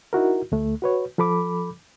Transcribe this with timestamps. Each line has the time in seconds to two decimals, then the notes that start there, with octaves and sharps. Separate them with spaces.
0.13 D#4 E4 F#4 A#4
0.52 D2 A3
0.82 F#4 B4 C#5
1.18 F3 A4 B5 D6